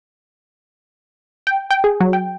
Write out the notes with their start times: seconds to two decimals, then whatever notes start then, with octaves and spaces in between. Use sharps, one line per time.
1.47 G5
1.71 G5
1.84 G#4
2.00 F#3
2.13 G5